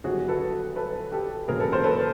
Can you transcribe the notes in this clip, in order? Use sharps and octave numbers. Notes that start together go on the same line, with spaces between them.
G1 F#2 D#3 G3 F#4 G#4
A4 B4
A4 B4
G4 A4
E1 D#2 C#3 F#3 G#4 A#4
A4 B4
A#4 C5
A4 B4